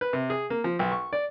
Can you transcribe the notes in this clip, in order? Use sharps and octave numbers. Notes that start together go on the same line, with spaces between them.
B4
C3
G#4
A#3
F3
B1
C#6
D5